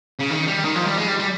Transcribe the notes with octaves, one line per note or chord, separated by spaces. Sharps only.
C#3
D#3
G3
D#3
F3
G3
G#3
G3
G3